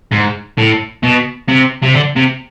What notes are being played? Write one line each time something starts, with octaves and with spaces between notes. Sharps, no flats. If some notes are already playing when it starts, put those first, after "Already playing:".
G#2
A2
B2
C3
C3
D3
C3